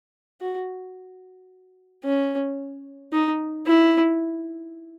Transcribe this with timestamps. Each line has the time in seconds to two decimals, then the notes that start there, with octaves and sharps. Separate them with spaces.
0.41 F#4
2.05 C#4
3.13 D#4
3.67 E4